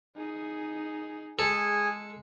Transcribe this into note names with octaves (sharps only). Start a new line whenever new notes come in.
D#4 G#4
G#3 G#4 A4 G#5